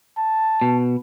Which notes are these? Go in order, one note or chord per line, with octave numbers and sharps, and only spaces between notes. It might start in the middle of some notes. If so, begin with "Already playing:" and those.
A5
B2